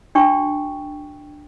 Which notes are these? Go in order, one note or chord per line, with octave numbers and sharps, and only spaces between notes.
D4 F#4 G5 C#6